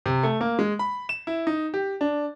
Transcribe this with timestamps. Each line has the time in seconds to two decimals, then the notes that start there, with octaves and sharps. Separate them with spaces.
0.06 C3
0.23 A3
0.41 A#3
0.59 G#3
0.79 B5
1.09 E7
1.27 E4
1.47 D#4
1.74 G4
2.01 D4